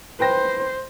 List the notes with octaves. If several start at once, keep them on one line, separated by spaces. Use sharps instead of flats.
B4 C5 G5 A#6